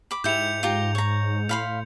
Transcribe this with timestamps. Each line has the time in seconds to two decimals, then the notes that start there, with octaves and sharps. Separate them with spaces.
0.11 B5 D6
0.24 G#2 E4 G4 G6 C#7 F7
0.63 F4 G4 A#5
0.95 C#5 A#5
1.49 A2 F5 B5 C6